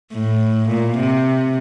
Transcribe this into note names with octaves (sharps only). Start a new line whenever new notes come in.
A2
A#2
C3